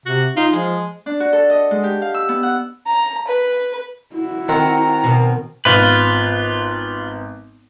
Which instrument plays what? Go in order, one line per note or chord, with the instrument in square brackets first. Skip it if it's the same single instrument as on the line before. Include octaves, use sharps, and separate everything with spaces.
[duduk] C3 [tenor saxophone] F#4
[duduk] D#4 [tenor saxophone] F4
[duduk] F3 [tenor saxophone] G#3
[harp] D4
F#4
A4
D#5
G#3
G4
F5
E6
B3
F#5
[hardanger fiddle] A#5
B4
[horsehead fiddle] E4 F#4
[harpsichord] D#3 C4 F#5 [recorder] A#5
[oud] B2 [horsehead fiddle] A#4
[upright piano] G#1 B3 [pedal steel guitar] F4 B4